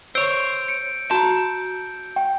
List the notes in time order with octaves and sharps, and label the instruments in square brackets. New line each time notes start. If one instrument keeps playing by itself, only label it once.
[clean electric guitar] C5 C#5 [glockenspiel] E6 G6 D7
[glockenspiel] C#7 D7
[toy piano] F#4 A#5 [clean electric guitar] A5 [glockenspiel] G6
[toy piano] G5